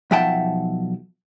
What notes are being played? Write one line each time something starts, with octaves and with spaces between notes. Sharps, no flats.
B1 F3 E5 F#5 G5 A5